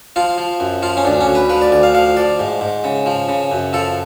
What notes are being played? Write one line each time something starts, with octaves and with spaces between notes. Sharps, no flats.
F3 F4
F3
F#2
F3 F4
C#4
D2 D4
C#4
D2
B4
F3 B4
D5
D2 D5
F5
F3 F5
F3 D5
G#2
G#2
C#3
F3
C#3
F#2
F3 A4